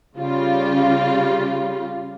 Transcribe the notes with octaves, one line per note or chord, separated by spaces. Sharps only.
C#3 G3 F4